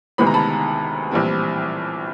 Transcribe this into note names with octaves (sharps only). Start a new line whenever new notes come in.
D2 C3 D#3 G#3 B3 B5
A#5
A5 B5
A#1 A2 E3 G3 C4